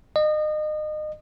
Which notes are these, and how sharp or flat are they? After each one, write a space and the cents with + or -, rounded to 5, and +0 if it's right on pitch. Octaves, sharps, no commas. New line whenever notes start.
D#5 -30